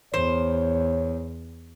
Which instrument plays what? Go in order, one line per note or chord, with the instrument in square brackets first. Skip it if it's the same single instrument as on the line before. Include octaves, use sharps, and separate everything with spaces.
[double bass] E2 [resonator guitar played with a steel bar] C5 [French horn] C#5